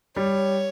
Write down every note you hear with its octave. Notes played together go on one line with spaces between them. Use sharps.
G3 C#5